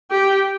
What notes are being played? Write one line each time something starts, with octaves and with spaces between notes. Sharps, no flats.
G4